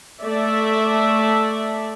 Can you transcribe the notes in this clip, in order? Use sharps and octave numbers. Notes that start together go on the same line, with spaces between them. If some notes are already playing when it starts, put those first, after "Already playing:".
A3 D5 E5